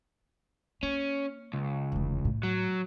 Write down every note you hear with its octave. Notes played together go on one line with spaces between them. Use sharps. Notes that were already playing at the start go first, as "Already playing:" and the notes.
A#3 C#4
C#2
F1 E2
A2
F#3